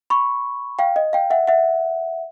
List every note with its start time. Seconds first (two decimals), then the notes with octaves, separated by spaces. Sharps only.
0.10 B5 C#6
0.79 F5 G5
0.96 D#5
1.13 F5 G5
1.30 E5 F#5
1.47 E5 F#5